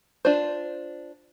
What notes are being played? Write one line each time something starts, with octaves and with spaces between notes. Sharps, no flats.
D4 F4 C5